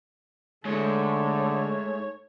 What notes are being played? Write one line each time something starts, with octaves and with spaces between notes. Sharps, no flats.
G#2 D3 A3 A4 C#5